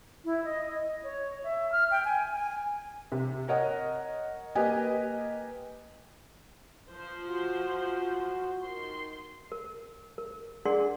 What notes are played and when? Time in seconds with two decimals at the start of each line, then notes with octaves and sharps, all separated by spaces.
0.25 E4
0.44 D#5
0.69 D#5
1.03 C#5
1.44 E5
1.72 F6
1.91 G5
2.05 G#5
2.32 G#5
3.12 C3
3.48 A#4 C#5 D#5 F#5
4.55 A#3 G4 B4 D#5 G#5
6.92 F3 C5
7.27 F#4
8.64 D#3 C6
9.52 A#4
10.18 A#4
10.65 D4 G#4 A#4 D5 F#5 C6